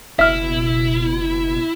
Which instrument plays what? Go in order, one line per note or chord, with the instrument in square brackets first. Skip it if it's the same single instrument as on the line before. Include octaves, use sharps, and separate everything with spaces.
[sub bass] F#1 [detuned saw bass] B2 [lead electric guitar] E4 [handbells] E5 F6